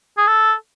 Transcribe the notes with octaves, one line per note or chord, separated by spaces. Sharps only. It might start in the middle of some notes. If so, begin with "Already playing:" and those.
G#4
A4